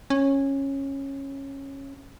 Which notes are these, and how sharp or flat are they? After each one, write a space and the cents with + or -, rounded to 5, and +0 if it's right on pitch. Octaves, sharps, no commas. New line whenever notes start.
C#4 -15